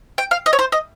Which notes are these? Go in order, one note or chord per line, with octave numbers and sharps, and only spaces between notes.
G5
F5
D#5
C#5
C5
D#5